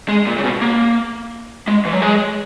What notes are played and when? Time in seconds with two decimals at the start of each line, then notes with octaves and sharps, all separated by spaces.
0.09 G#3
0.27 A#2
0.38 C#3
0.44 B2
0.61 A#3
1.68 G#3
1.85 E3
1.93 F#3
2.02 G#3